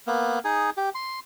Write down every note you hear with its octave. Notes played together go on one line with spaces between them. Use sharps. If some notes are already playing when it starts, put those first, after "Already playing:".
A#3 B3
D#4 G#4
G4
C6